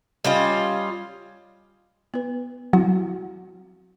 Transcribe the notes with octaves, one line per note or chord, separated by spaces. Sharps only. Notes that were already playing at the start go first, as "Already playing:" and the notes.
G3 C#4 F4 D#5
B3 B4
F#3 C4 E4 F#4